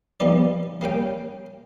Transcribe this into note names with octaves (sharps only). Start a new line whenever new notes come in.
F3 G3 B3 D#4 D5
G3 A#3 C#4 G5